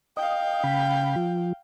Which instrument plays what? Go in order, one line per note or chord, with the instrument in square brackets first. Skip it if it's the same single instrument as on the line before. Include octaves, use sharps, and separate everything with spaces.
[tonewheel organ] D#5 [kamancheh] F5 G5
[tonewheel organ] C#3 B5
F3